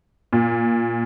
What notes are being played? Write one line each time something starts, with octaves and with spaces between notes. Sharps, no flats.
A#2